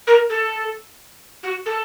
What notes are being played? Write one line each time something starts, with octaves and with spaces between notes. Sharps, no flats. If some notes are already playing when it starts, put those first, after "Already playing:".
A#4
A4
F#4
A4